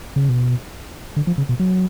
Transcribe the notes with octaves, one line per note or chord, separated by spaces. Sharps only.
C#3
B2
D3
F3
C#3
B2
F#3